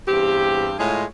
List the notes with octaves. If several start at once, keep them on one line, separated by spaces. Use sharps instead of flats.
E2 G2 C4 G4
A2 G#3 F4 G#4 C#5 D#5